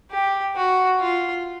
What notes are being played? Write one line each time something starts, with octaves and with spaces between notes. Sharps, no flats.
G4
F#4
F4